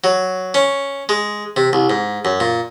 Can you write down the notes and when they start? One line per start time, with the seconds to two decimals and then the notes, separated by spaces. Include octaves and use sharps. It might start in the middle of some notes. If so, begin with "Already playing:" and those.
0.04 F#3
0.54 C#4
1.09 G#3
1.56 C3
1.73 C2
1.90 G#2
2.25 F#2
2.40 A#2